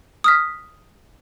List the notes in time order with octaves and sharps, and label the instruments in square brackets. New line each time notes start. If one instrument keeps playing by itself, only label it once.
[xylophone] D#6 F6 B6